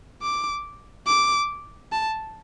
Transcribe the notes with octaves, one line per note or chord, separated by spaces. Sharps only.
D6
D6
A5